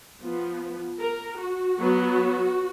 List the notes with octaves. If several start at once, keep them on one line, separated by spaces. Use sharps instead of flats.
F3 B3
A#4
F#4
F#3 B3